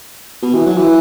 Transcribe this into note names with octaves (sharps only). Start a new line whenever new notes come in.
B2
E3
F#3
E3